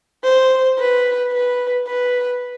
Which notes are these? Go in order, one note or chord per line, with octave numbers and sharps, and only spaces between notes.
C5
B4
B4
B4